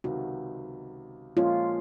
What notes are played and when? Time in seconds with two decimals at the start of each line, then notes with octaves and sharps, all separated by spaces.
0.04 C#2 C3 D#3 F#4
1.37 A#2 F3 G#3 C#4 F4